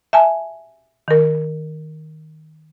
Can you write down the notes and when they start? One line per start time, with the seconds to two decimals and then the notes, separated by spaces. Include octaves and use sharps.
0.13 E5 G#5 A5
1.08 D#3 A#4